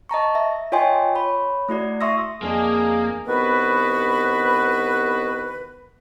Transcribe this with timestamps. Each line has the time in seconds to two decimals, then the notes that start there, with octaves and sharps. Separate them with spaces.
0.09 D#5 A5 A#5 C#6
0.35 E5
0.72 F4 C#5 D#5 G5 G#5 C6
1.15 C#5 B5
1.69 A3 E4 F#4 D5
2.01 E5 C6 C#6 D#6 E6 A#6
2.42 F2 A#3 D4 G#4 D#5
3.27 C2 D#3 B3 F#4 B4